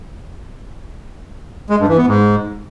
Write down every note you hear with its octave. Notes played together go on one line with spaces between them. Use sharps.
G#3
G2
E3
B3
G#2